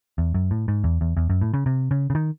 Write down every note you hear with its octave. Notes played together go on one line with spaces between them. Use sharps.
E2
F#2
A2
G#2
E2
E2
E2
F#2
A2
C#3
C3
C#3
C#3
D#3